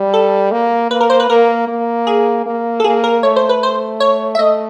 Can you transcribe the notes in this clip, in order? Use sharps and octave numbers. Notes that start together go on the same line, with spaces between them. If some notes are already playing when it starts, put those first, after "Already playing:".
Already playing: G3
A4
A#3
A#3 B4
A#4
C5
B4
A#3 A#4
A#3
G#4
A#3
A4
A#3 G#4
A#4
A3 C#5
C5
B4
C5
C#5
E5
A3 D#5